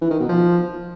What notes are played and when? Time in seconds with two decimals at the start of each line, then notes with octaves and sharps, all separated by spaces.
0.01 E3
0.11 D#3
0.20 B2
0.29 F3